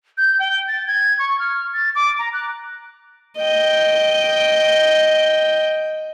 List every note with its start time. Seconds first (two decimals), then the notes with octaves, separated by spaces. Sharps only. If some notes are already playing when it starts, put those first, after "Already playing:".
0.18 G6
0.39 G5
0.68 A6
0.87 G#6
1.19 C#6
1.39 F6
1.74 A6
1.95 D6
2.19 A#5
2.33 F#6
3.37 D#5 G5